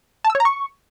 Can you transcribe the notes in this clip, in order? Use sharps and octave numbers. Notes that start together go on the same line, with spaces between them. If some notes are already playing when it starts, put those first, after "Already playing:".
A5
E6
C#5
A#5
C#6